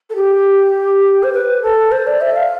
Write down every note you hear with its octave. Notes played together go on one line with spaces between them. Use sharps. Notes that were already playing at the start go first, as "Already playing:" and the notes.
A4
G4
C5
B4
A4
C5
D5
E5
F5